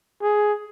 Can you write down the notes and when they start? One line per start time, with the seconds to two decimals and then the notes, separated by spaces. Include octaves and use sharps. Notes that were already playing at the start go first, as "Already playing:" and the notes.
0.22 G#4